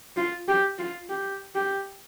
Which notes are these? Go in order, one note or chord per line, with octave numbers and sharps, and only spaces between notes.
F4
G4
F4
G4
G4